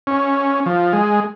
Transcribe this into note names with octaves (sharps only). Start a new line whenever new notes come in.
C#4
F3
G#3